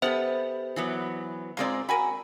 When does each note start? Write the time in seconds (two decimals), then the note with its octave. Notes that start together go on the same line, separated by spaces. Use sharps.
0.02 B3 G4 A4 C5 E5 F#5
0.76 E3 F#3 B3
1.57 G#2 G#3 C4 F4 A#4 D5
1.89 F#4 A#4 G#5 B5